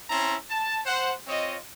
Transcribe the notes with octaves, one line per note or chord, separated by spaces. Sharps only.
C4 C#4 E4 A5 A#5 C6
A5
C5 F#5
C4 F4 C#5 D#5